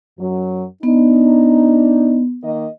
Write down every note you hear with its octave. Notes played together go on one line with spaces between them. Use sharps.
F#2 F#3
B3 D4 D#4
D#3 A#3 D#5